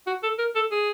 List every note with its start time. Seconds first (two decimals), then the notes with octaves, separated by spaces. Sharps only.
0.07 F#4
0.23 A4
0.39 A#4
0.55 A4
0.71 G#4